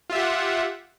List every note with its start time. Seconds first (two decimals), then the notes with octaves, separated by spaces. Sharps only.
0.10 F4
0.12 E5
0.15 G4
0.18 F#5